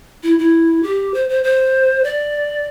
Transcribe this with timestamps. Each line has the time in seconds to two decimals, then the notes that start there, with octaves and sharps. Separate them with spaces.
0.23 E4
0.39 E4
0.83 G4
1.14 C5
1.29 C5
1.44 C5
2.04 D5